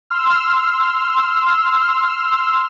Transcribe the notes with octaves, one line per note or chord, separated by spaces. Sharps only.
C6 E6 F6